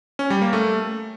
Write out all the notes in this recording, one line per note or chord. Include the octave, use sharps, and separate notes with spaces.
C#4
G3
A#3
A3